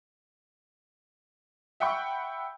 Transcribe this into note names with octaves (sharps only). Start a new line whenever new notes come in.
E5 F#5 G5 B5 C#6